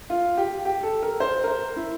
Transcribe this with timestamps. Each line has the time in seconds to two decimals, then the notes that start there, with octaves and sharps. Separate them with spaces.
0.10 F4
0.37 G4
0.65 G4
0.83 A4
1.03 A#4
1.20 C5
1.44 A#4
1.48 C5
1.76 E4